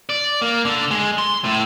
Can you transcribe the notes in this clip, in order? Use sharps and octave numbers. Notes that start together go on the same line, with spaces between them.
D5
A#3
D3
G#3
C6
A2